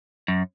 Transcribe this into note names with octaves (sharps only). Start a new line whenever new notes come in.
F#2